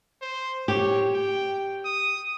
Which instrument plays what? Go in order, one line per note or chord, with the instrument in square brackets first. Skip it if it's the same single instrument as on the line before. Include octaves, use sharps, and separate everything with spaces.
[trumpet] C5
[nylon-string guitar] G4 [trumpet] C#5
[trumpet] G5
D#6